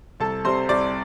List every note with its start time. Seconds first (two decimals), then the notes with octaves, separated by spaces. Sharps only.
0.20 C2 A4 A5
0.44 C3 G3 C5 C6
0.69 C2 D5 D6